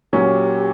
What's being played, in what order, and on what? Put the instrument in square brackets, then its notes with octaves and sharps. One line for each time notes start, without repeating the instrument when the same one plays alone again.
[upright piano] A#2 F#3 A#3 C#4 [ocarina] G4